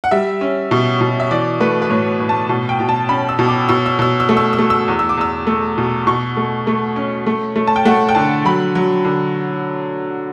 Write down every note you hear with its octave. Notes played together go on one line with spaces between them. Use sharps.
F#5
G3 E5
C#4
B2
B2
E5
E3 D5
A3 B4
B4
A2 C#5
A2
A5
B2 A5
G5
B2
A5
C#4 B5
E6
B2
D6
B2 E6
E6
B2 E6
E6
A3
E6
E6
A3
E6
E2
E6
D6
E2 E6
A3
B2
B2 C#6
A3
A3
C#4
A3
A3
A5
G5
A3 F#5
G5
D3 A5
F#3 B5
F#3
D3